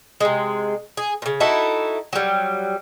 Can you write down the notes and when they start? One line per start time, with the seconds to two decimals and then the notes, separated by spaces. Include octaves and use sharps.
0.20 C3 G#3
0.97 G#4
1.22 A#2 C#3
1.40 D#4 E4 F#4 A4
2.13 F#3 G3